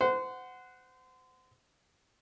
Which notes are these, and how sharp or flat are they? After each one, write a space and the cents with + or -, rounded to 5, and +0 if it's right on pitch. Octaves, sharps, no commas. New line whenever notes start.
C5 -25 F#5 +0